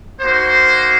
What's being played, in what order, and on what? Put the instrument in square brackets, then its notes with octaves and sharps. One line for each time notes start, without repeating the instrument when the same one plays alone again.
[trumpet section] A#3 D#4 F#4 C5